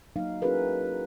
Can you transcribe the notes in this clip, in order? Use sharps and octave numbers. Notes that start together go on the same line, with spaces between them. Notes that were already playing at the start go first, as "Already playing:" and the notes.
F#3 A#3 D#4 F5
C#4 E4 F#4 G#4 A#4 B4